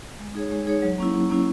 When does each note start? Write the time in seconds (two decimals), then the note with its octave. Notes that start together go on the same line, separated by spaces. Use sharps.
0.19 G#3
0.35 D#4 G#4 C#5
0.51 G#3
0.67 D#4 G#4 C#5
0.82 F#3
0.98 A#3 C#4 E4
1.14 F#3
1.30 A#3 C#4 E4